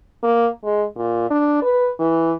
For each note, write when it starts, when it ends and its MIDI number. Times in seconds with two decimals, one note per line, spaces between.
0.23 0.48 58
0.64 0.84 56
0.96 1.27 46
1.30 1.58 62
1.62 1.90 71
1.99 2.33 52